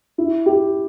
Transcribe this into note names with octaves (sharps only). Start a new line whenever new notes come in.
E4
G4